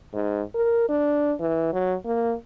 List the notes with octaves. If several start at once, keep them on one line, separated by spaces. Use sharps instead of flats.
G#2
A#4
D4
E3
F#3
A#3